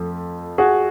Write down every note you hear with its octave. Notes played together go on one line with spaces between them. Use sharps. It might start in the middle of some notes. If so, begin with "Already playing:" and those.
Already playing: F2 F3 A3
F#4 G#4